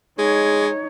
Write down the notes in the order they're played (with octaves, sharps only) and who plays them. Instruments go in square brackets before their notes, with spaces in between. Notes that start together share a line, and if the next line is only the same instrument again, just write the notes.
[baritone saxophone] G#3 [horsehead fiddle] D#4 C#5